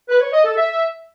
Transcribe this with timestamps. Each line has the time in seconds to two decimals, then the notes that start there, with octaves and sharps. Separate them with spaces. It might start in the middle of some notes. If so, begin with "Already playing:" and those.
0.09 B4
0.21 C#5
0.33 D#5
0.45 A4
0.56 E5